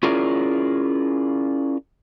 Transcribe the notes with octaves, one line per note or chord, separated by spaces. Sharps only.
C#4 E4 F4 G#4 A#4 D5